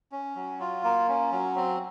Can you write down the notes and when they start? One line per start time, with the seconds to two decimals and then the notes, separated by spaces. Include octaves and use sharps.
0.12 C#4
0.36 F#3
0.60 F4
0.84 A#3
1.08 C#4
1.32 F#3
1.56 C4